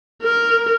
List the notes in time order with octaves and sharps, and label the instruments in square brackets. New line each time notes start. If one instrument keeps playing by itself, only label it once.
[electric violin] A#4